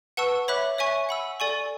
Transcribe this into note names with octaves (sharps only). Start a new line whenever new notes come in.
B4 F#5 A5 C#6 E6
C#5 E5 B5 D6 F#6
C#5 E5 G#5 C#6
F#5 B5 E6
A4 D5 G#5 C#6